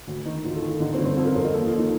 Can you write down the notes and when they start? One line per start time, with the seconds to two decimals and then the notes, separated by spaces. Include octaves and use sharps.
0.07 D2
0.26 D#3 D#4
0.45 D2 F4
0.56 A4
0.62 D#3
0.69 F4
0.80 D3 D#4
0.93 C4
0.99 G1
1.05 C4
1.17 F2 A4
1.27 A#4
1.35 F2 C5
1.45 D#5
1.54 D#2 A4
1.66 F4
1.72 D#2
1.78 D#4